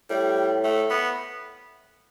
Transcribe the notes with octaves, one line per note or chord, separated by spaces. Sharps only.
A2 G3
A3
B3